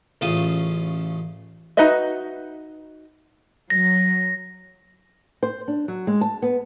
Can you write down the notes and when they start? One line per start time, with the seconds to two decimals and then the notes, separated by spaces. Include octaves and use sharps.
0.21 A1 C#3 A3 F4 D#6
1.77 D#4 F#4 B4 D#5 E5
3.70 F#3 A#6
5.43 C5
5.68 D4
5.88 F#3
6.07 G#3
6.21 A5
6.42 B3